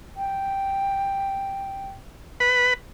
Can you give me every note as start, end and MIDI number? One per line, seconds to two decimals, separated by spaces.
0.17 1.87 79
2.40 2.74 71
2.40 2.74 83